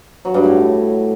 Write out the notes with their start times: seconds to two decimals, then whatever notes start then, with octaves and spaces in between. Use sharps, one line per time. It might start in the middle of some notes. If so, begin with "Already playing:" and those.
0.25 F#3
0.34 G2
0.44 A2